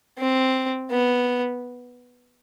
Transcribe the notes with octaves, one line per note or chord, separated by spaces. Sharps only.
C4
B3